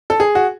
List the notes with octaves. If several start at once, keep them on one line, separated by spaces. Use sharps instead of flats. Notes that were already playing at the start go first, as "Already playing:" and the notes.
A4
G#4
F#4